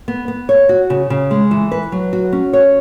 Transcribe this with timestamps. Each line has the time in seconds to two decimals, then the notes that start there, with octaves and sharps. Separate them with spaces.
0.08 B3
0.28 B3
0.49 C#5
0.69 F#4
0.90 C#3
1.10 C#3
1.31 G#3
1.51 E3
1.71 B4
1.92 F#3
2.13 F#4
2.33 C#4
2.53 C#5